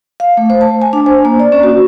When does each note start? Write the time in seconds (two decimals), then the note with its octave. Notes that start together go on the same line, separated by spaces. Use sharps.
0.20 F5
0.37 A3
0.50 C5
0.61 A5
0.82 G#5
0.93 D4
1.06 C5
1.25 A#3
1.40 D5
1.52 C#4
1.63 F#4